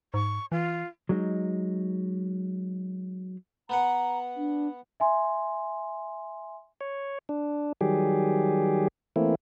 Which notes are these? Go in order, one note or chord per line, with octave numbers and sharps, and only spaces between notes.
G#2 C#6
E3 F4
F#3 G#3 D#4
B3 B4 F#5 A#5
D4
E5 G#5 C6
C#5
D4
D#3 F#3 G3 G4 G#4
E3 A3 A#3 C4 E4